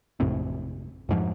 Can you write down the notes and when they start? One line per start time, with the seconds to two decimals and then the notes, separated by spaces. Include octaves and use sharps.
0.20 A1 F2 A2 C3
1.09 F2 G#2 F3